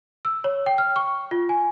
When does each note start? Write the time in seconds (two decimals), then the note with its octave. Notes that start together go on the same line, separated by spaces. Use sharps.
0.25 E6
0.44 C#5
0.66 G5
0.78 F6
0.96 C#6
1.31 F4
1.49 G#5